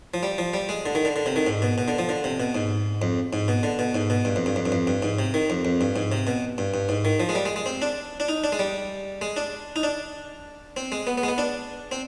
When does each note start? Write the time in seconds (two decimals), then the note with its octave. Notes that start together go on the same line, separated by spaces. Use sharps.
0.14 F3
0.23 G3
0.38 F3
0.54 G3
0.69 G#3
0.86 D3
0.95 D#3
1.05 D3
1.16 D3
1.26 C3
1.36 D#3
1.47 G#2
1.62 B2
1.78 B2
1.88 D3
1.99 F3
2.09 D3
2.24 C3
2.40 B2
2.55 G#2
3.02 F2
3.33 G#2
3.48 B2
3.63 D3
3.79 B2
3.95 G#2
4.10 B2
4.25 G2
4.36 F2
4.46 G2
4.56 F2
4.66 G2
4.72 F2
4.87 G2
5.02 G#2
5.19 C3
5.34 D#3
5.50 F2
5.65 F2
5.81 G2
5.96 G#2
6.12 C3
6.27 B2
6.58 G2
6.74 G2
6.89 G#2
7.05 D#3
7.20 F3
7.29 G#3
7.35 G3
7.46 G#3
7.56 G#3
7.66 C4
7.82 D4
8.20 D4
8.29 D#4
8.44 D4
8.52 G#3
8.59 G3
9.21 G#3
9.37 D4
9.76 D#4
9.83 D4
10.77 C4
10.92 G#3
11.07 B3
11.18 B3
11.23 G#3
11.28 B3
11.38 D4
11.92 C4